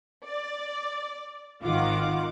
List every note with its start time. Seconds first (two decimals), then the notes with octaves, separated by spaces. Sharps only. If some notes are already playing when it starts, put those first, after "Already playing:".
0.25 D5
1.64 G#1 D#3 F4 F#5 D6